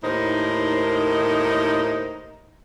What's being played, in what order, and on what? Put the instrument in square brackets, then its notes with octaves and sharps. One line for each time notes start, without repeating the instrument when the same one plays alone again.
[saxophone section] D#2 A2 D#4 A#4 C5